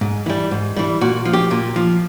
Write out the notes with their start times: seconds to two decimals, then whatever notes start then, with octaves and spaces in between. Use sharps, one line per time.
0.01 G#2
0.26 E3 G3
0.51 G#2
0.76 E3 G3
1.01 A#2 F#4
1.25 F3
1.33 G4
1.51 A#2
1.76 F3